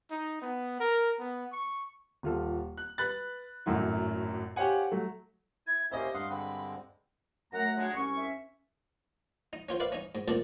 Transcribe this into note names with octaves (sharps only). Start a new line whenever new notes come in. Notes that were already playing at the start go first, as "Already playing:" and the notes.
D#4
B3
A#4
B3
C#6
D#1 F4 A4
F#6
B4 B5 F#6 A6
G#1 F#2 A2 F#3 E4
G4 C5 C#5 F5 F#5 G#5
F#3 A3
E4 G#6
A#3 C#4 E4 G4 C5 D#5 E5
G2 F5 F#5 C6 D#6
D3 G#3 C4 B5
F#2 A3 F#5 A#5
D3 F#3 G#3
C2 C#4 C#6
E5
D#4
C#4 F4 C5
B4 D5 E5 F5
C#4 D#4
G#2
F2 A#2 E3 A3 D5